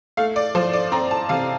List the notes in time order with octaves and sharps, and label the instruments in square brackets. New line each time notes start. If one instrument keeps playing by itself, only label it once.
[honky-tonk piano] A3 F5
D5
F3 C5
D5
C4 A#5
A5
C3 F5